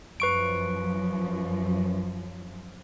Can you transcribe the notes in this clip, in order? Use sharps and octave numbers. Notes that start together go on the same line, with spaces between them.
F#2 F3 B4 C#6 D7